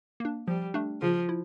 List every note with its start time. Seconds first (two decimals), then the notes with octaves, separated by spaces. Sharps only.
0.20 A#3 D4
0.47 F3 G3
0.74 A3 D4
1.01 C#3 F3
1.29 E4